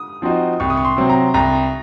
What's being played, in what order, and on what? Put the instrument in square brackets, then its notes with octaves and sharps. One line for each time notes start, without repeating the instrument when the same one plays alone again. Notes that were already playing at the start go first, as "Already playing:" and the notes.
Already playing: [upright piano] D#6
[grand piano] F3 C4 D#4 F#4
[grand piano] C2 [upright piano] C#6
[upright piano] D#6
C#6
C6
[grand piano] C3 F#3 C4
[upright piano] A#5
[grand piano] C2 [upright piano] A#5